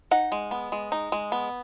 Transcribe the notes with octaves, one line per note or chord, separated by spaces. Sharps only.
D#4 F#5
G#3
B3
G#3
D#4
G#3
B3